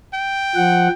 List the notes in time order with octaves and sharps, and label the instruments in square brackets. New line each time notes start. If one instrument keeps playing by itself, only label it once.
[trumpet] G5
[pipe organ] F3 F#5